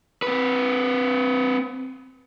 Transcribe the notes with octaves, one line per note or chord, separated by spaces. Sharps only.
C4 B4